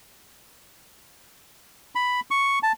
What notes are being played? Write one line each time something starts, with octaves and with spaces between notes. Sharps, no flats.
B5
C#6
A5